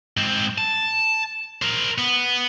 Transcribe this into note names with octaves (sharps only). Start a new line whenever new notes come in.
G#2 C4
A5
A#4 C5
B3